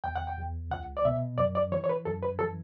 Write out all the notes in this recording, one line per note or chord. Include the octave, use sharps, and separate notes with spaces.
E2 G5
F#5
G5
E2
C#2 F#5
D5
B2 E5
F#2 D5
D5
E3 C#5
C#5
B4
F#2 A4
B4
E3 A4